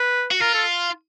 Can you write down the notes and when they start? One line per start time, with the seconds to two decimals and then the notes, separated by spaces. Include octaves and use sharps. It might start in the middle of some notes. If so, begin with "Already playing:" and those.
Already playing: B4
0.31 F#4
0.41 F4 A#4
0.54 A4